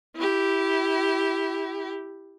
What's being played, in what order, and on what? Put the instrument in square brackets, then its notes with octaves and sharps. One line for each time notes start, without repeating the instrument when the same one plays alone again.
[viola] E4 G4